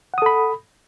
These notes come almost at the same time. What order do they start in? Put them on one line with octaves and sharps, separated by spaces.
F#5 D#6 A4 B5